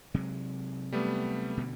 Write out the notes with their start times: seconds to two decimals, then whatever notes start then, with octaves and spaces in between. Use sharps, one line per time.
0.14 C3 F#3 G#3
0.92 G3 A3 B3
1.57 B2 D3